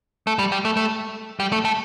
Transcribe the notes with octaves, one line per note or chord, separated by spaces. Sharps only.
A3
G3
G3
A3
A3
G3
A3
A3